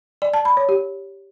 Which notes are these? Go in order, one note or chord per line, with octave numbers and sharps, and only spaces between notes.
D5
A5
B5
C#5
G4